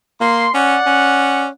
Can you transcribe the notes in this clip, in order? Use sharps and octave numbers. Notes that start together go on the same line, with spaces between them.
A#3 C6
C#4 D5 F#5
C#4